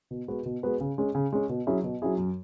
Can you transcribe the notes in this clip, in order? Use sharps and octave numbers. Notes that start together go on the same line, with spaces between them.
B2
G#3 B3 F#4 B4
B2
G#3 B3 F#4 B4
C#3
G#3 C#4
C#3
G#3 C#4
B2
F#3 C#4 E4 G#4
B2
F#3 C#4 E4 G#4
F#2